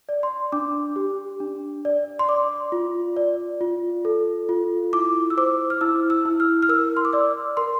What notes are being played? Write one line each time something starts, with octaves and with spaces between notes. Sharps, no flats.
D5
C6
D4 D6
G4
D4
D5
C6
D5 D6
F4
D5
F4
A4
F4
E4 D6
E6
C5 D6
F6
E4 E6
E6
E4
F6
F6
A#4 E6
C6
D6
D5 E6
A#4 C6